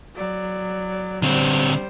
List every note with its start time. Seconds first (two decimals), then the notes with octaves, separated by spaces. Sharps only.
0.15 F#3 D5
1.22 D3 G3 C4 C5